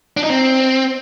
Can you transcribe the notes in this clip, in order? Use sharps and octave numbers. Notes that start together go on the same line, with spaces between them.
D4
D#4
C4